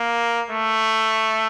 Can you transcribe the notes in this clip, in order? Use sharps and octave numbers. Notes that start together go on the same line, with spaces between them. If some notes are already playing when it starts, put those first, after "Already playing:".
Already playing: A#3
A3